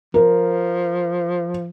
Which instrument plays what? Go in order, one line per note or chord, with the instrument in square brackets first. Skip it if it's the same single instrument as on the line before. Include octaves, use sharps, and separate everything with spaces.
[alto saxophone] F3 [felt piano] A#4